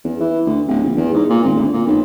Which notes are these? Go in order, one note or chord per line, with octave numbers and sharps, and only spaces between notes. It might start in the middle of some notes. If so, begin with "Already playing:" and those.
E2
E3
D2
D1
A#1
E2
G#2
A#2
G#1
D2
A#2
B1